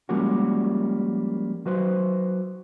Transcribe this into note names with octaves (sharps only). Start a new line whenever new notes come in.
F3 G3 G#3 A#3 C#4 F#4
F#3 F#4 B4 C5